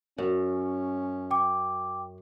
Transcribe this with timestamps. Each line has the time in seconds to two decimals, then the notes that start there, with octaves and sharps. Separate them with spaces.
0.18 F#2 C#4
1.31 G5 D6